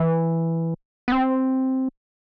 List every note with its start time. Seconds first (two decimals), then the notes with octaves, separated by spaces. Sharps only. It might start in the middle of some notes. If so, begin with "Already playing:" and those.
Already playing: E3
1.08 B3
1.12 C4